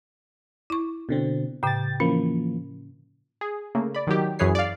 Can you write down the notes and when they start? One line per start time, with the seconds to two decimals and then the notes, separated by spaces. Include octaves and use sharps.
0.70 E4 C#6
1.09 B2 D3 C4
1.63 A2 C#3 G5 A6
2.00 E3 F3 A#3 C#4
3.41 G#4
3.75 C#3 A3 A#3
3.95 D5 B5
4.07 D#3 F#3 G4
4.39 F#2 E3 G#4 B4 C#5 C7
4.55 D5 F5